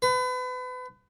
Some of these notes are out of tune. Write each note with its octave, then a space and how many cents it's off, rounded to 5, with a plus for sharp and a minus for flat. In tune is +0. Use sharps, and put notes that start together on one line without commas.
B4 +35